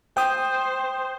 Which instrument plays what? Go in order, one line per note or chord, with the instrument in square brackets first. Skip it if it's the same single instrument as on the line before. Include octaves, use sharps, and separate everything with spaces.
[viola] C5 [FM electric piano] G5 D#6